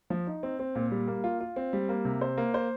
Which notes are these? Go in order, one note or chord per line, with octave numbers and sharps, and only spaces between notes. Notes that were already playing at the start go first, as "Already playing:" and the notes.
F3
D#4
C4
C4
A#2
G3
A#3
F4
F4
C4
G3
A#3
C3
C5
A#3
C5